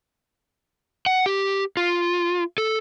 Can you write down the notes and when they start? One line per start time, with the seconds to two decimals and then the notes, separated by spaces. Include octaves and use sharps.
1.06 F#5
1.26 G4
1.77 F4
2.58 A4